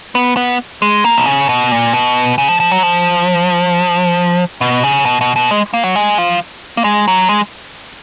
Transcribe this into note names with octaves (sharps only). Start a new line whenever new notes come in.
B3
B3
G#3
A#3
B2
C#3
B2
A#2
B2
C#3
F3
F3
F#3
F3
B2
C#3
B2
B2
B2
G#3
A#3
F#3
G#3
F3
A#3
G#3
F#3
G#3